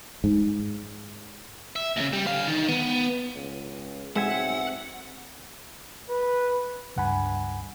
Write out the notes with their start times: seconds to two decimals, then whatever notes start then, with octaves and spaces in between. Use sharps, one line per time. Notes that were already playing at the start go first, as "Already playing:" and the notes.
0.24 G#2
1.76 E5
1.97 D#2 C#3
2.13 G3
2.27 D3 F5
2.48 D#3
2.69 B3
3.35 C#2
4.16 B1 G#3 C4 E5 F#5 G#5
6.10 B4
6.96 C#2 G2 F#5 G#5 B5